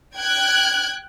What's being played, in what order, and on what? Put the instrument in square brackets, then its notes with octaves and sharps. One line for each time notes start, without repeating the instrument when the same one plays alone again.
[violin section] G5 F#6 G#6